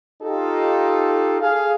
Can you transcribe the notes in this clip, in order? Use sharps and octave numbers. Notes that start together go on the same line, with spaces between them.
D#4 F4 G4 A4
G#4 F5